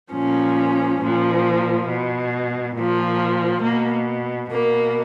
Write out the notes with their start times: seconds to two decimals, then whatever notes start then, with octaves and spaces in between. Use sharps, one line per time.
0.13 A#2 F3 C#4
1.01 A#2 F3
1.88 B2
2.76 A#2 F3
3.63 B2 A#3
4.50 B2 A#3